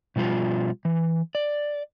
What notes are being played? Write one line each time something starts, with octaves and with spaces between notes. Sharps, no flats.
B2 F3 G3 F4
E3
D5